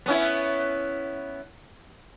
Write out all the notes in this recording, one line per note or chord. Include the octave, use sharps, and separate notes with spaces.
B3 C#4 E4